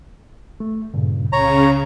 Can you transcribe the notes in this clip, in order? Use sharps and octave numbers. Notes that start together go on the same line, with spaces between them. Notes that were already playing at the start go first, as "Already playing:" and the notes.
A3
G2 A#2 C#3
C#2 C#3 C#5 A#5